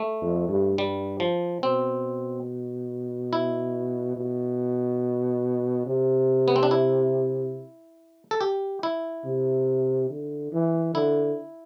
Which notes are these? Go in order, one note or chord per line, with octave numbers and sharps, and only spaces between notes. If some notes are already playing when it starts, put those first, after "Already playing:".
Already playing: A3
F2
G2
G2 G3
F3
B2 C4
E4
B2
C3
B3
C4
D4
E4
A4
G4
E4
C3
D3
E3
D3 E4